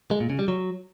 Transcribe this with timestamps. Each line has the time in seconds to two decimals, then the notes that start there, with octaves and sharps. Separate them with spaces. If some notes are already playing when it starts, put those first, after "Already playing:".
0.11 G#3
0.20 A#2
0.30 C#3
0.39 G3
0.48 F#3